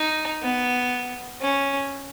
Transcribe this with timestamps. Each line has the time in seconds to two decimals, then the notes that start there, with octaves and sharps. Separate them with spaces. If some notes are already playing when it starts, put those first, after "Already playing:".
Already playing: D#4
0.42 B3
1.41 C#4